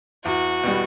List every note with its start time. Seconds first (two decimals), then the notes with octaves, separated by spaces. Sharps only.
0.25 E2 F#4
0.63 B2 G3